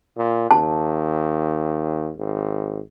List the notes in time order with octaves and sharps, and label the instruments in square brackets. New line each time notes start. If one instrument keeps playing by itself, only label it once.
[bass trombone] A#2
[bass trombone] D#2 [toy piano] A5
[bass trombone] G#1